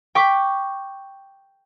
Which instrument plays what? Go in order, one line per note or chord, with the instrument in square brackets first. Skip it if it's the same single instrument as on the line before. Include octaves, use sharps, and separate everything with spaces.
[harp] G5 C#6 D6 B6